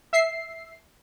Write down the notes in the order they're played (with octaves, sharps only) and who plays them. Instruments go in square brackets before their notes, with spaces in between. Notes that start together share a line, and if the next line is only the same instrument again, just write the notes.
[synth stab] E5 C7